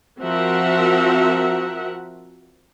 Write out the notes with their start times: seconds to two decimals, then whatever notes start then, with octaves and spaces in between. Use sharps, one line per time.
0.21 F3 C4 F#4 A#4 E5 F#5